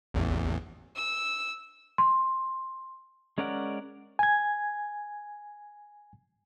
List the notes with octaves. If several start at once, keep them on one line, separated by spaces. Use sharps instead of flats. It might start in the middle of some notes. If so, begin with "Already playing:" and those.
A1 E2
E6
C6
G#3 C#4 A#4 D5 F#5
G#5 G#6